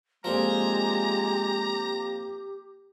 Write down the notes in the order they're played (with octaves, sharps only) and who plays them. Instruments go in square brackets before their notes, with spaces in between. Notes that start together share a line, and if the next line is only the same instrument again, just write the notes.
[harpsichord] F2 A#2 F3 [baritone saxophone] G#3 [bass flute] G4 [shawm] A#5